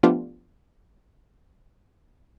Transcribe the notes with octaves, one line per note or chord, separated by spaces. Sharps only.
F3 A3 B3 D4 F4 G4